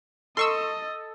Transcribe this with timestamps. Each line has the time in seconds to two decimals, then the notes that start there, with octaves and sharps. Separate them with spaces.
0.37 A4 D#5 C6 C#6 E6